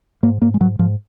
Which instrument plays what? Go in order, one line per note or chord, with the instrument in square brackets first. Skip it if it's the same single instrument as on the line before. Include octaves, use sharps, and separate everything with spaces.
[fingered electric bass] G#2 A#3
G#2 A#3
G#3
G#2 F#3
G#2 F3